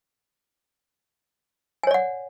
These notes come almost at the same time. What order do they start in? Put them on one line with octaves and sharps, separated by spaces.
G#5 C#5 D5 F#5